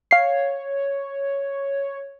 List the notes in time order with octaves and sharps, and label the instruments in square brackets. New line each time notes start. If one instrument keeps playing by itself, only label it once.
[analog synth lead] C#5 [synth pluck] F5 C7